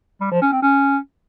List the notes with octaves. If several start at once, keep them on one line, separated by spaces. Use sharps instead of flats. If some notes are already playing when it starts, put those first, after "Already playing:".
G3
F3
C#4
C4
C#4